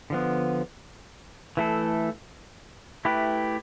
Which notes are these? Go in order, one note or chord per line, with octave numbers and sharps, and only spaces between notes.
D3 F3 B3
E3 A3 E4 A4
A3 E4 G4 B4